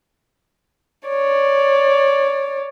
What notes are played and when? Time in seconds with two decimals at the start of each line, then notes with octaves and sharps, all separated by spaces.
1.08 C#5 D5